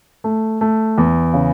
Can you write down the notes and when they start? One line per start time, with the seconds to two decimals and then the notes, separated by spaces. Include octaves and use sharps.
0.24 A3
0.61 A3
0.98 E2
1.33 C#3